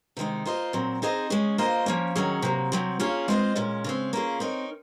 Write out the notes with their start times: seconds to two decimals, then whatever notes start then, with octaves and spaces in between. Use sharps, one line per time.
0.17 C3 D#3 G#3 D#4
0.46 A#3 F4 C5 D#5
0.73 A#2 F#3 C4
1.02 C4 D#4 G#4 C5 D#5
1.30 G#3 C#4 G#4
1.58 A#3 F4 C5 D#5
1.86 F3 A#3 C#4
2.15 D#3 F#3 C#4 G#4
2.42 C3 F#3 A#3
2.72 C3 F#3 C4
3.00 A#3 C#4 F4 G#4 C#5
3.28 G#3 C4 F4 C5 D#5
3.56 A#2 G#3 C#4
3.84 C#3 G#3 C4
4.13 A#3 C#4 F4 G#4
4.40 C4 D#4 A#4 C#5